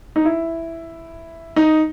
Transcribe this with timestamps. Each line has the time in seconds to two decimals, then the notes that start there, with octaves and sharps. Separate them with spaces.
0.16 D#4
0.25 E4
1.56 D#4